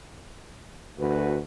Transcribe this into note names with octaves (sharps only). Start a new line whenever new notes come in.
D2 F#4 B4